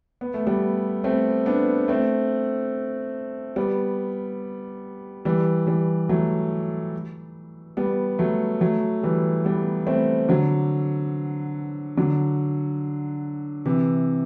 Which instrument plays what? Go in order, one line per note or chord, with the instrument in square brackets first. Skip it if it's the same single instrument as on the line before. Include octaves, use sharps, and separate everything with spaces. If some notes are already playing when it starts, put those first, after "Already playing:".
[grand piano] B3
A3
G3 B3
A3 C4
B3 D4
A3 C4
G3 B3
E3 G3
E3 G3
F#3 A3
G3 B3
F#3 A3
F#3 A3
E3 G3
G3 B3
A3 C4
D3 F#3
D3 F#3
C3 E3